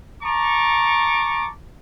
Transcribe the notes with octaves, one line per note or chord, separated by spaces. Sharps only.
A5 A#5 C#6 D6